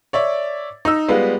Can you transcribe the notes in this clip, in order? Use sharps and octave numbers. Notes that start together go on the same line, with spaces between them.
C#5 D5 E5
D#4 E6
G3 G#3 B3 F4 B4